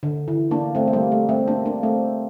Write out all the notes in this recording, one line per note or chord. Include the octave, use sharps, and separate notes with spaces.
D3
E3
A#3 D4
A3 C4
A3
G3 A#3
A3
A3 C4
A#3 D4
A#3 D4
A3 C4